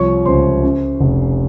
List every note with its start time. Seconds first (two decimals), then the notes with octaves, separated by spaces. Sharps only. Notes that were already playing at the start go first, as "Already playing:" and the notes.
Already playing: C2 F3 C#5 C#6
0.26 C#2 C5 C6
0.63 C#3
1.00 F1